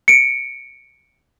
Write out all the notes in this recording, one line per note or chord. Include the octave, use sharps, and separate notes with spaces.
C#7 D7